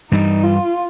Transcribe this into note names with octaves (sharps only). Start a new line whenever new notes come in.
G2 E3 G3 D#4
F4